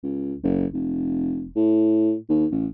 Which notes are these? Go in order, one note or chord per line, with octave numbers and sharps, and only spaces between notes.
C#2
F#1
F1
A2
D#2
A1